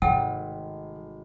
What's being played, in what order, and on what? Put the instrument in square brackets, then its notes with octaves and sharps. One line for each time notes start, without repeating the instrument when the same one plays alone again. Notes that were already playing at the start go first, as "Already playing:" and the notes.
[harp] G#1 G#2 A3 [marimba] C3 [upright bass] D#3 [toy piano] F#5 G5